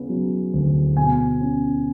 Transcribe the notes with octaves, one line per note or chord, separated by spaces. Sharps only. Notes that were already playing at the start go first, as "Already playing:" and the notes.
Already playing: C#3 B3
F#3
D2
B2 G#5
C#4